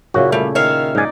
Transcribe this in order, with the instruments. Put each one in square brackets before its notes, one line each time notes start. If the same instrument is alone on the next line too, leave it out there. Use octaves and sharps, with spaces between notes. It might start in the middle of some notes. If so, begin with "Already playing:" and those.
[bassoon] F#2 [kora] A#2 C#3 E4 [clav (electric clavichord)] F#4
[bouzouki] G3 [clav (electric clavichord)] A3
[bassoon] D#3 [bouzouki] C#5 E5 F5
[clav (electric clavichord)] G#2 G#5 [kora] D#4 D5